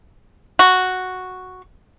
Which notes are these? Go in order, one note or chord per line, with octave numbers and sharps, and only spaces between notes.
F#4